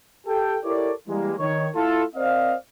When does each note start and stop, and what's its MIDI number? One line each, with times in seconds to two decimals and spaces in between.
0.27 0.58 67
0.27 0.58 69
0.27 0.58 79
0.64 0.92 64
0.64 0.92 67
0.64 0.92 69
0.64 0.92 70
0.64 0.92 73
0.64 0.92 74
1.08 1.33 52
1.08 1.33 55
1.08 1.33 56
1.08 1.33 58
1.38 1.68 51
1.38 1.68 73
1.75 2.03 57
1.75 2.03 64
1.75 2.03 65
1.75 2.03 69
2.16 2.54 60
2.16 2.54 70
2.16 2.54 72
2.16 2.54 74
2.16 2.54 75
2.16 2.54 77